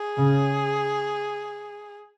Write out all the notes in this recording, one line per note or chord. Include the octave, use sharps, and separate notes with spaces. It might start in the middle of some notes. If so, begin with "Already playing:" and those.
Already playing: G#4
C#3